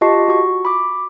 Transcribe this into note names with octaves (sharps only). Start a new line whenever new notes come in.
F4 G4 D#5 A5 C#6 C7
F#4 C#6
B5 D6